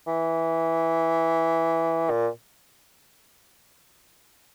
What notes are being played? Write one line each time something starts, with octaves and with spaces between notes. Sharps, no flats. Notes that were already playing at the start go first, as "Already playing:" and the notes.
E3
A#2